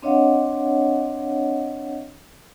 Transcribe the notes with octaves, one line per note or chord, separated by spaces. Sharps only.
C4 D4 C#5 D#5 F5 F#5